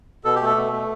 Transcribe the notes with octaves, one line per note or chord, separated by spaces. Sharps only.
B2 A4
G4
A3 A4
B2
A3